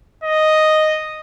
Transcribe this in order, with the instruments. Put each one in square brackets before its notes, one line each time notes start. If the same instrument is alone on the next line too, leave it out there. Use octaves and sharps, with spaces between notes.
[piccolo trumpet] D#5